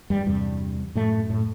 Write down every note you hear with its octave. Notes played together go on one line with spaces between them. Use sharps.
G2 G3
E2 G2 C3 G3
F#2 A2 A3
A2 A3